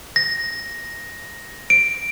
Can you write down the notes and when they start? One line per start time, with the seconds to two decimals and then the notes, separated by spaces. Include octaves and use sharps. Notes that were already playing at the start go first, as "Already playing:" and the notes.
0.16 A#6
1.70 D7